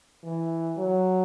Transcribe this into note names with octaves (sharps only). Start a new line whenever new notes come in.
E3
F#3